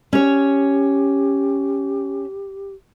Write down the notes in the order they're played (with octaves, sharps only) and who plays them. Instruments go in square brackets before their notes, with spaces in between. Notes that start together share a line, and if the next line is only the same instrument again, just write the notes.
[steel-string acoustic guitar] C#4 C#5 [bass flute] G4